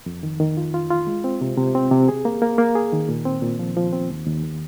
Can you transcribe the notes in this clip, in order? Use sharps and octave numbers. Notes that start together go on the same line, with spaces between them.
F2
D#3
D#3
F4
F4
F4
G#3
C4
C3
C3
C4
C3
G#4
A#3
A#3
A#3
G#4
D#3
A#2
C4
A#2
F3
F3
C4
D#2
D#2
D#3